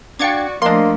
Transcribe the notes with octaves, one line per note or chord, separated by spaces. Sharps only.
D4 F#4 D5 F5 G5 G#6 A6 C#7
F3 A3 A#3 D4 D5 D#5 C6